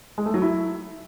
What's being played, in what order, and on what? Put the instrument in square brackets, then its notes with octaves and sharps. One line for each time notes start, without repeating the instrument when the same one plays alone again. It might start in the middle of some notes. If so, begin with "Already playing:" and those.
[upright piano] G#3
A3
F#3
E4